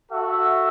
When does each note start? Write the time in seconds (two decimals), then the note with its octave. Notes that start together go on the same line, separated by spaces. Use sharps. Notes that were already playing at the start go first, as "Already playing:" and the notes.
0.11 F#4 A4 E5